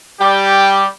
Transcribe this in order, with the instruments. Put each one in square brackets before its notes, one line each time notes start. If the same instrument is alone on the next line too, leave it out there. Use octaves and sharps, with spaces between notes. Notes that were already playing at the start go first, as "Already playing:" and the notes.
[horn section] G3 G4